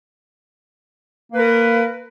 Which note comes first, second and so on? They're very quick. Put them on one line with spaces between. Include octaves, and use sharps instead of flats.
A#3 B4 A#4